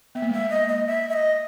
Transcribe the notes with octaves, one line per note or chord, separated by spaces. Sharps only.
B3 E5
A#3
G#3
A#3 E5
D#5
D#5
E5
E5
D#5